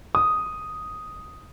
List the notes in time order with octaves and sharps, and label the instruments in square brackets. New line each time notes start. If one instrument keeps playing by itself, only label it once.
[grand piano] D#6